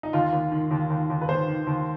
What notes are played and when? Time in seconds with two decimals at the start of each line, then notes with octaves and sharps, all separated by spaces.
0.03 D#4
0.13 D#2 F4
0.33 D#2
0.52 D#3
0.71 D#2
0.90 D#2
1.10 D#2
1.22 B4
1.29 D#2 C5
1.48 D#3
1.67 D#2